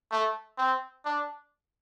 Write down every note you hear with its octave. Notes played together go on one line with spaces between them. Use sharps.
A3
C4
D4